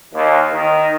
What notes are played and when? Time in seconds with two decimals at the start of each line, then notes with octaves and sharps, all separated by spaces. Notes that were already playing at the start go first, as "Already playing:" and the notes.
0.13 D#2
0.52 D#3